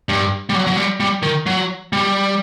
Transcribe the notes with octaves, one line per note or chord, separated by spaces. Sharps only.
G2
G3
F#3
F#3
G3
G3
D#3
F#3
G3